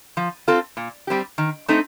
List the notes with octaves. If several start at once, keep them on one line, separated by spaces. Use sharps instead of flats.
F3
C4 F4 A4
A#2
G3 C4 G4
D#3
A3 C4 D#4 A4